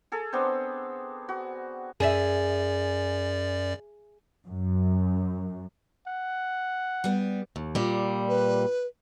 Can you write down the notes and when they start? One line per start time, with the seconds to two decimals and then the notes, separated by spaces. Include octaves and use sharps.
0.12 G#4 A4
0.33 B3 C4 D4 C5
1.29 F#4
2.00 F#2 G#4 D5 E5
4.46 F#2
6.07 F#5
7.04 G3 B3
7.56 D#2
7.75 A#2 G3
8.29 B4